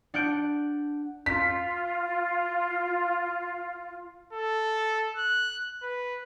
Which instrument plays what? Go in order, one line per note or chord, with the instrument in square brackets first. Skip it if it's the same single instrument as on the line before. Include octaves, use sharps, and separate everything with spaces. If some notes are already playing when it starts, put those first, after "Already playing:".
[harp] D4 F#5 F#6 G6 D7
[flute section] F4 [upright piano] B6
[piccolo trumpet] A4
F#6
B4